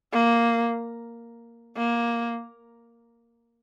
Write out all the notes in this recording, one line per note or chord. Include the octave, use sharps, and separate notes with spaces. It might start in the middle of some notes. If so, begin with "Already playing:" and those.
A#3
A#3